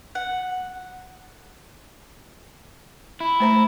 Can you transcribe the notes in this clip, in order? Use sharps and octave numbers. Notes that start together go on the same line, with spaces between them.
F#5
E4
A3 C5 A#5